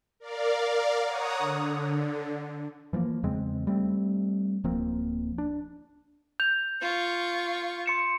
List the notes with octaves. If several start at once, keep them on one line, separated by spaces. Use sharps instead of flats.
A#4 D5 F5
C#5 F#5 A#5 D#6
D3
E3 F3 A3 A#3
E2 C#3 G#3 C4
G3 A3 C4
D1 F3 A#3 C4
D4
G6 F7
F4 C#6
C6 C#7 E7